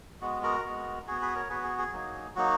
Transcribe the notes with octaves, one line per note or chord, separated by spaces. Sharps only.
G#3 B3 F#4
F#4 A#4
G#3 B3 F#4
B3 F#4 G#4
G#4 B4
A#4 C#5
B3 F#4 G#4 B4
G#4
G#4
F#3 A#3 D#4
F#3 A#3 D#4 F#4